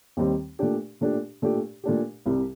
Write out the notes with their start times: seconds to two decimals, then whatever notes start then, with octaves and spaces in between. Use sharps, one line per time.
0.17 D#2 D#3 G3 C4 G4
0.59 A#2 A3 D4 G4
1.01 A#2 A3 D4 G4
1.42 A#2 A3 D4 G4
1.84 A#2 A3 D4 G4
2.26 C2 C3 G3